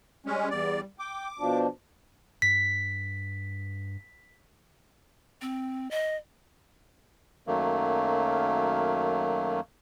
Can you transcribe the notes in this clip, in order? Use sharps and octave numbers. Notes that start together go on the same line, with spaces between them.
G3 G#3 C#4
E2 D5
G5 D6
B2 F3 D4
G2 B6
C4
D#5
F#2 D#3 F#3 A3 A#3